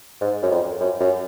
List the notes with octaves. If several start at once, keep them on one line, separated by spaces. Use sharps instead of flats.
G#2
F#2
F2
F#2
F#2